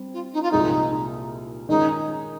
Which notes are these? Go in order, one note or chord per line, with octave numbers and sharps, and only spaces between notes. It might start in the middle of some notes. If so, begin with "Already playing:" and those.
Already playing: G3 C4
F4
D#4
F4
C2 A#2 F3 G#3 D#4
D#3 G#3 C#4 D#4